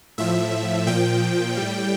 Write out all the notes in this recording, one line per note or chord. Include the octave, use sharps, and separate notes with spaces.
A2 F3 E5
A#2 F3 G5
A2 G3